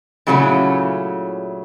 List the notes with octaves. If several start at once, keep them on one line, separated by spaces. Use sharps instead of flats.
A#2 C#3 F#3 A3 C#4 E4